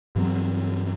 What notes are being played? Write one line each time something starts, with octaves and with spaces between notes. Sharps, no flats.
G2 E3 F#3 C4